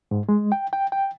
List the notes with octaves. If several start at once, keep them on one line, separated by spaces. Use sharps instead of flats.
G#2
G#3
G5
G5
G5